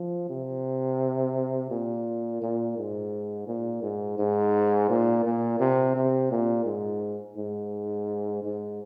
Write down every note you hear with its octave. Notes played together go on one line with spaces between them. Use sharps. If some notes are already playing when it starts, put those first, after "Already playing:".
Already playing: F3
C3
A#2
A#2
G#2
A#2
G#2
G#2
A#2
A#2
C3
C3
A#2
G#2
G#2
G#2